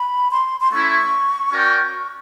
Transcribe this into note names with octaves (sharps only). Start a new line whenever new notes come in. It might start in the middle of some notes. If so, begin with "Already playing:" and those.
Already playing: B5
C6
C6
A3 C#4 E4 C#6
C#4 F#4 A#4 D5 G5